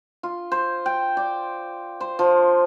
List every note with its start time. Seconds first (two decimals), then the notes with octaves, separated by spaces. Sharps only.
0.23 F4
0.52 C5
0.86 G5
1.17 D5
2.00 C5
2.19 F3